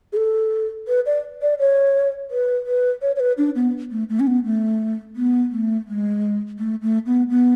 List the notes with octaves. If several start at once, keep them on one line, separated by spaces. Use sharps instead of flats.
G#4
A4
B4
D5
D5
C#5
B4
B4
C#5
C#5
B4
D4
B3
A3
A3
C#4
B3
A3
B3
A3
G#3
A3
A3
B3
B3